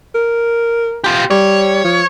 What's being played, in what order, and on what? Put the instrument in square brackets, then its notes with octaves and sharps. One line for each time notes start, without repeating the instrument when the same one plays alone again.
[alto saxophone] A#4
[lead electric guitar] F4 G4
[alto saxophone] G3 [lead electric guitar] C#5
[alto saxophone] F3